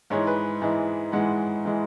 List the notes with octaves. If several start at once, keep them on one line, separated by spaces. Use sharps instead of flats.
G#2 E3 G#3 C#5
B4
G#2 E3 G#3
G#2 E3 G#3 F#5
E3 G#3